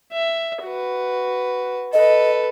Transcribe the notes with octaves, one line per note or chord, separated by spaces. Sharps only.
E5
F#4 B4
A4 B4 D#5